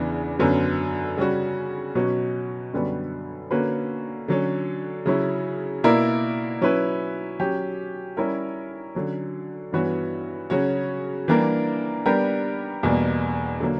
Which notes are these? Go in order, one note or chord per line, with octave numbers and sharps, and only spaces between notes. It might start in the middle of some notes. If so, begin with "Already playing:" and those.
Already playing: E2 C#3 E3 B3 D4
F#2 D3 F#3 B3
C#3 G3 C#4 F#4
B2 F#3 C#4 F#4
F#2 D3 G3 B3 F#4
D3 A#3 C#4 F#4 B4
D3 F#3 C#4
C#3 F#3 C#4 E4
B2 A#3 E4 A#4 D5
F#3 C#4 E4 B4
F#3 C#4 G4
G3 C#4 E4 A#4 C#5
D3 F#3 C#4
G2 E3 B3 F#4 C#5
C#3 F#3 C#4 F#4 C#5
E3 G3 A#3 D4 A#4
G3 B3 D4 G4 A#4
E2 B2 G3 A#3
D3 F#3 A#3